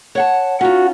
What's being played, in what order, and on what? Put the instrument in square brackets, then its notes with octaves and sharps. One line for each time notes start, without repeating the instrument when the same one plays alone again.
[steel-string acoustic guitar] C#5 F#5 A5
[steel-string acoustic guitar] C#4 D#4 F4 [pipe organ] F#4